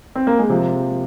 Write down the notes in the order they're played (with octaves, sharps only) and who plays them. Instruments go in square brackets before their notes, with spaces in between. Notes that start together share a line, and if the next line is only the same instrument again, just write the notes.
[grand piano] C4
A#3
G#3
C3 F3